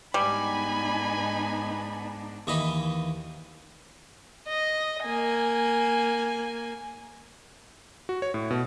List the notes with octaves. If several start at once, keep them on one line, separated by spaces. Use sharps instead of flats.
G#2 G3 B3 D4 D#4 G#5 B5
D#2 E3 D#4 D#5 B5
D#5
A#3 G#5
F#4
C#5
A2
B2